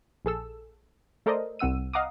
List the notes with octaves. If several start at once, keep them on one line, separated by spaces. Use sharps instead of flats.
A#1 G#4 A4 E6
A3 A4 A#4 C5 D5 D#5
C2 C4 F#5 E6 D#7
D#5 F5 F#5 A#5 D6 D#6